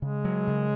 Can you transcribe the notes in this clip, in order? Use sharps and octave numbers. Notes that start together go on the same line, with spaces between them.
C#3 G#3
F#3
C#3